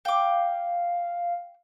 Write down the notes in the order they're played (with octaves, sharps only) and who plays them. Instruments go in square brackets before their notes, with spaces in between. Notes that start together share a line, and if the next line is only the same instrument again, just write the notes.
[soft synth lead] F5 [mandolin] G5 D6